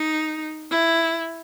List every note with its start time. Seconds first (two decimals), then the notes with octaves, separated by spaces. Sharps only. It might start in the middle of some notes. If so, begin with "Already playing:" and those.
Already playing: D#4
0.71 E4